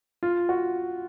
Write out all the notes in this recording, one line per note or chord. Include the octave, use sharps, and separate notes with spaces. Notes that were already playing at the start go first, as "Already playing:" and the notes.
F4
F#4